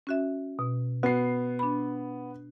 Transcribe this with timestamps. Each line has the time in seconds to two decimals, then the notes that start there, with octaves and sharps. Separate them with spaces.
0.07 C#4 F#4 E5
0.59 B2
1.03 B3 F#4 C7
1.59 D4 B5